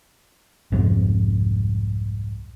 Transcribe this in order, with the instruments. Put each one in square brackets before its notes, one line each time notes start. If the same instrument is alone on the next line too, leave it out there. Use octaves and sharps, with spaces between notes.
[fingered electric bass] C2 F2 G#2